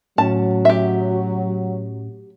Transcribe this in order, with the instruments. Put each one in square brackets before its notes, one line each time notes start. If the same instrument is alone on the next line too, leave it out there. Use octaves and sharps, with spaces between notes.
[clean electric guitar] A2 C#4 [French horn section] F#3 [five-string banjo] A5
[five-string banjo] G4 E5